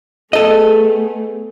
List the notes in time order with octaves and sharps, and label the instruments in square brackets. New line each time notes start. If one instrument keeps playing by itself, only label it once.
[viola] A3 [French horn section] B3 G#4 [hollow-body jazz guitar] A4 D#5